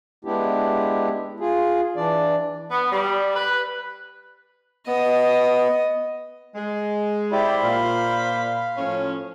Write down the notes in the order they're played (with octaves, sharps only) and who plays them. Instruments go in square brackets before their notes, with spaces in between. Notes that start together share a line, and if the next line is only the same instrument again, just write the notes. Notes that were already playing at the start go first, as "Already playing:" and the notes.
[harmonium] G#3 B3 D4 E4 G4
F4 G#4
E3 D4 D5
[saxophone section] B3
G3
B4
[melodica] B3 [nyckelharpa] D#5
[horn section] G#3
[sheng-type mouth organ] E4 G4 D5 [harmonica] C5 B5
[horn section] A#2 [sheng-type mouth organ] F5
[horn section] A2 F3 C#4